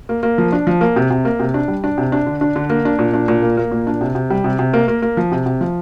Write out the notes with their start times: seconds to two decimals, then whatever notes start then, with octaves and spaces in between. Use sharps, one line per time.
0.09 A#3
0.23 A#3
0.38 F3
0.52 D4
0.67 F3
0.81 A#3
0.96 C3
1.10 C3
1.25 A#3
1.39 C3
1.54 D4
1.68 G3
1.84 D4
1.98 C3
2.12 D4
2.26 D3
2.41 D4
2.56 D3
2.70 A#3
2.85 D4
2.99 A#2
3.13 D4
3.28 A#2
3.42 A#3
3.57 A#3
3.72 A#2
3.87 D4
4.01 C3
4.15 C3
4.30 G3
4.44 C3
4.59 C3
4.73 A#3
4.88 A#3
5.02 A#3
5.17 F3
5.32 C3
5.46 C3
5.61 F3